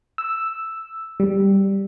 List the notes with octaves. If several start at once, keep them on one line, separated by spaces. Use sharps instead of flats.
E6
G3